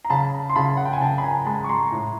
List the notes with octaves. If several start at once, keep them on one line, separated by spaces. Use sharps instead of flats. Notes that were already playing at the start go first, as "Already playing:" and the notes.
A#5
C#3 A5 B5
C6
C#3 A5 B5
F#5
G5
G#5
C#3 G5 A5
B5
G#5 A#5
G#3 A5 B5
C#6
A#5 C6
A2